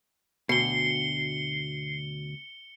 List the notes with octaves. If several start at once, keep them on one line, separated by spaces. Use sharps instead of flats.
D2 B2 C7 C#7 G7